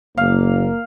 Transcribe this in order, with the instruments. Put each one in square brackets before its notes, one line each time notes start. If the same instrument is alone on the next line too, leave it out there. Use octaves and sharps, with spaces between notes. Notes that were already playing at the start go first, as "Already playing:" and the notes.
[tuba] F#1 [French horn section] A#3 [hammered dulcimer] F5